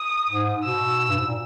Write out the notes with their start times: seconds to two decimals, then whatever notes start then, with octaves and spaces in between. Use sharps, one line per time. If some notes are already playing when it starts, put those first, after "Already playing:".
Already playing: D#6
0.30 G#2
0.64 B2 E6
1.10 G2
1.17 G#2
1.26 A#2